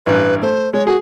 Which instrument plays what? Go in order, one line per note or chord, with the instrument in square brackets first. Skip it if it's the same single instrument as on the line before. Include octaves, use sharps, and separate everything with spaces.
[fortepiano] A1 G2 [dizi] B4
[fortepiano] A3 [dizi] C5
[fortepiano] G#3 [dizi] C#5
[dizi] F#4 [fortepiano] G#4